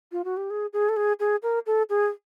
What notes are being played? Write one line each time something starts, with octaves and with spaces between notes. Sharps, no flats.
F4
F#4
G4
G#4
G#4
A4
G#4
G#4
A#4
A4
G#4